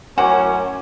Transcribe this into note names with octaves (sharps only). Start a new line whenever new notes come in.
F#2 A2 C#4 F#4 A#4 C5 G#5 D6